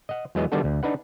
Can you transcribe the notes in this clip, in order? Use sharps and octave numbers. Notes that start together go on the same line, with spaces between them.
D#5 F#5
E2 F#3 G#3 B3 D#5
D#3 G3 B3 D4 F#4 A4
D2
D4 D#4 B4 F#5